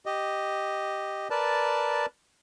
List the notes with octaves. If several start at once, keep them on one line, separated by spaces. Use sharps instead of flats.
G4 D#5
A#4 B4 D5 A5